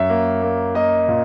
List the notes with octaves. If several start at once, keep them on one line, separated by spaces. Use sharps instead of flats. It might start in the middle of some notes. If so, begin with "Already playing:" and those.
Already playing: F#2 E5
A#3
A#3
A#3 D#5
A#2